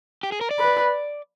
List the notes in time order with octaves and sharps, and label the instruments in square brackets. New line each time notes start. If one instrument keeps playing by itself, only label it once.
[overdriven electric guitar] G4
G#4
A#4
D5
[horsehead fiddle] B4